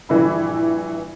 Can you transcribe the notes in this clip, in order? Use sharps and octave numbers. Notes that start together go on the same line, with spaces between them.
A#1 G2 E3 E4 B5